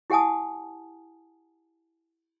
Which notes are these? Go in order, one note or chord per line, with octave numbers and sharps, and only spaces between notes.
E4 G4 F#5 G#5 A5 D#6